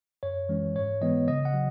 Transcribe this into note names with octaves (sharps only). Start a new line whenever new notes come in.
F#2 C#5
E3 G#3 C#4
G#2 C#5
E3 G#3 B3 D#5
C#3 D#5
F#5
F#3